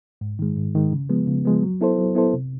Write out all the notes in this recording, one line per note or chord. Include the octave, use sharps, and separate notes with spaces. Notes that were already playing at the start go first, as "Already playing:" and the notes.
G#2
D#3 G#3
G#2
D#3 G#3
C#3
F3 G#3 B3
C#3
F3 G#3 B3
F#3
B3 E4 A4 C5
F#3
B3 E4 A4 C5
C3